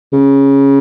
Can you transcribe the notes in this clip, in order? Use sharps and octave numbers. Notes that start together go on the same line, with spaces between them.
C#3